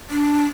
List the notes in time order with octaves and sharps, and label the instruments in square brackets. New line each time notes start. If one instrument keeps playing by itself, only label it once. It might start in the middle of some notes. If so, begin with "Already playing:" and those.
[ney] D4